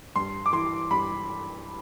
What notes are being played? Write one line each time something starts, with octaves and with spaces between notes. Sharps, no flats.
G2 C6
D6
E3 C6
G2 B5